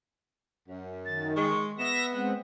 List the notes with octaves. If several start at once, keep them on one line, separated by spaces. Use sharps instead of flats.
F#2
D#3 A6
G#3 C#6
B3 E5 A#6 E7
G#3 C4 F#5